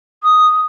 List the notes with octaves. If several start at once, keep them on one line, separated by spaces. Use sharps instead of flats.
D#6